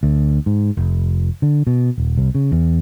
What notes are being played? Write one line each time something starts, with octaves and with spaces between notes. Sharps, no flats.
D2
G#2
F1
D3
B2
D#1
C2
C#3
E2